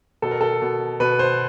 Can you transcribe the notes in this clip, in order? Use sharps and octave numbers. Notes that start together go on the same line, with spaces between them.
B2 A4
A#4
A4
B2
B2 B4
C5